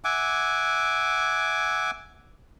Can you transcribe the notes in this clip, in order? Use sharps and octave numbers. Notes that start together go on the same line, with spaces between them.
E5 F#5 G#5 D6